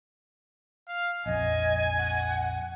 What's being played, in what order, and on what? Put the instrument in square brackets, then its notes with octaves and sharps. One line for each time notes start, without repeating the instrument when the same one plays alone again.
[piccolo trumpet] F5
[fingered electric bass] A#1 F2 [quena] D#5 [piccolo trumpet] G#5
[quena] F#5